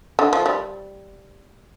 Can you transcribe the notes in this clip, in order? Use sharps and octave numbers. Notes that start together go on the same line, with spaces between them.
D3
F3
G3